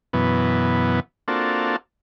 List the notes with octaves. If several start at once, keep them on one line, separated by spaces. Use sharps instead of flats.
F#2 B2 E3 B3
A#3 C4 D4 F4 F#4 A4